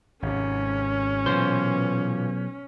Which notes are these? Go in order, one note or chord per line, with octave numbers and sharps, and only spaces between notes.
G#1 C3 C#4
B1 A#2 E3 C5 C6